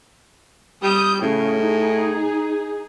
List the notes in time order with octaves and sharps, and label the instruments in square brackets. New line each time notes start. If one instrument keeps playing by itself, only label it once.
[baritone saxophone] G3 [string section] D#6 G6
[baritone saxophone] A2 [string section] C#3
[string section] D#4 G#4